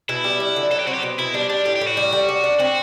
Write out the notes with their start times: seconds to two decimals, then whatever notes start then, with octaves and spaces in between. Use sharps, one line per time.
0.09 B2 E4
0.24 G3
0.40 D4
0.56 D3
0.71 F#3 A4
0.79 G4
0.87 C4 F#4
0.94 G4
1.03 B2
1.19 B2 E4
1.34 G3 D4
1.50 G3 D4
1.65 A2 G4
1.76 G4
1.81 A2
1.87 F#4
1.97 G3
2.12 G3
2.28 D4
2.44 D4
2.59 C4 F#4